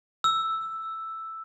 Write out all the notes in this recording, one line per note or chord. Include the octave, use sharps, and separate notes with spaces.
E6